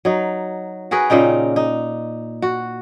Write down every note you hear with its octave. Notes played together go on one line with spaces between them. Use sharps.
F#3 D#4
F#4 G#4 A#4 B4
A#2 C#3 D#4 G5
D#4
F#4